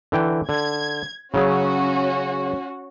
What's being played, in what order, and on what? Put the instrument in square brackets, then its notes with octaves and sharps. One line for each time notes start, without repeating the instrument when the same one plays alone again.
[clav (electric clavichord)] D3 E3 G5
[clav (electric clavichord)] D3 [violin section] G#6
[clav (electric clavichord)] C#3 F#3 G#4 [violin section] C#4 F#4